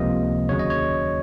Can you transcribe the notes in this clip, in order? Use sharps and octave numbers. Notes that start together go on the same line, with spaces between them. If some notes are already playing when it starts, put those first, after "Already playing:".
Already playing: C#2 C3 F3 A#3 D#5
D#2 C#3 F#3 C#5
D#5
C#5